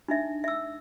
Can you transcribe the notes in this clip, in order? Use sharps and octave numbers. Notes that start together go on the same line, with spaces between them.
D4 D#4 E5
E5 E6